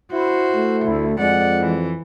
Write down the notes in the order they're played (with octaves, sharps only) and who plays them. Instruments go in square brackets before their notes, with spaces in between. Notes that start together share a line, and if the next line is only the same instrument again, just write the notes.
[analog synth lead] E4 [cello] F#4 C5
[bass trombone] A3
[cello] D2 [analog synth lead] E4
[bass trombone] F2 [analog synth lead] G#3 [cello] D5 F#5
[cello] E3